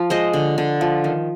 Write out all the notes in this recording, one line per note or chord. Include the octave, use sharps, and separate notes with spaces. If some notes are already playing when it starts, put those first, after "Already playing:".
Already playing: F3 F5
G#3 C5 D#5
D3
D3
F3
D#3